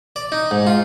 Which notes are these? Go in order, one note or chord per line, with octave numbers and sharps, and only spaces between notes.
D5
D#4
G#2
F4